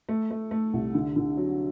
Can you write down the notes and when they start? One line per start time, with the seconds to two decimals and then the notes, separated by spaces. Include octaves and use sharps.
0.09 A3
0.31 A3
0.51 A3
0.73 C2
0.94 D3
1.16 D3
1.37 F#3